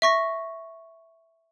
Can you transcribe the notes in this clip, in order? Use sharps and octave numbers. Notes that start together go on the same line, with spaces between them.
E5 C#6 A#6